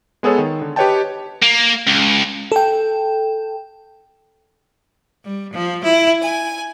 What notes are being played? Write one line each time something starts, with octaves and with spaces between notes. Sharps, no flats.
G#3 B3 G#4 A4 C#5
D#3
D3
G4 B4 C#5 D#5 G5 A5
A#3
C#2
A4 G5
G3
F3
E4
G#5